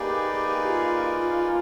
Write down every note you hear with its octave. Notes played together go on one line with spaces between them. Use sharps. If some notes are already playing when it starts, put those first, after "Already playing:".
Already playing: A#3 D#4 G4 G#4 B4 D5
F4
F4